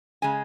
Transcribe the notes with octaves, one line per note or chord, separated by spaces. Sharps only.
C#3 G#3 G#5